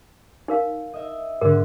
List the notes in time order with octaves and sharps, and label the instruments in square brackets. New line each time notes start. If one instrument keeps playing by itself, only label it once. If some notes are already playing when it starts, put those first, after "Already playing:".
[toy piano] D#4 A#4 F5
[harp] D#5 E5
[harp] G#2 D3 [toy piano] A#4